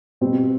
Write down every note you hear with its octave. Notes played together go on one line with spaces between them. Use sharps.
B2 G3 C4